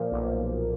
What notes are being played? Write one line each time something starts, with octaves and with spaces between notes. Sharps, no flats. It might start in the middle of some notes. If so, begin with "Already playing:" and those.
Already playing: A#2 F3 A#3
B1